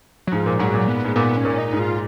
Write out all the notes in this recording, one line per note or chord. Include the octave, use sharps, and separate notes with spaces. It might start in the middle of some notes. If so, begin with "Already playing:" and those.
F#3
G#2 F3
A#2
G#2 F#3
A#2
B3
G#2
A#2 B3
C#4
A#2
D#4
G#2
F4